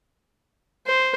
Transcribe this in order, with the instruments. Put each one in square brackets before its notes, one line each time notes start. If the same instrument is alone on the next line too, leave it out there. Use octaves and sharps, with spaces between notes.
[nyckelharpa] C5